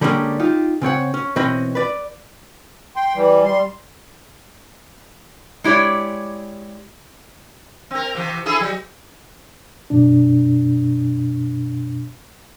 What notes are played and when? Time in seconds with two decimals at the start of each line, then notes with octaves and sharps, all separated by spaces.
0.01 D3 G3 G#3 A#3 C4 C#4
0.40 D#4 F4 G4
0.82 C#3 C4 C#5 F#5
1.14 C#4
1.36 B2 E3 C4 C#4 D#5 B5
1.75 B4 D5
2.96 G5 C6
3.16 E3 G3
3.45 G3 C6
5.64 G#3 E4 G4 C#5 D5
7.91 C4 A#4
8.15 C3 E3
8.46 E4 G#4 A4
8.61 F#3
9.90 F#2 B2 D4